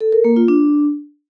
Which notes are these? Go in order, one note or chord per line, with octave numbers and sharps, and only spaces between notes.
A4
A#4
A#3
F4
D4